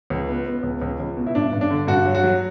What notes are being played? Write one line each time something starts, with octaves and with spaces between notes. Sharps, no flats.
C#2
B3
B3
C#2
C#2
C#2
B2
E4
G2 D4
G2
D4
D3
G2 F#4
F#3
F#4
F#3